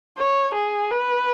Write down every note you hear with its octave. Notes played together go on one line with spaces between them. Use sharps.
C#5
G#4
B4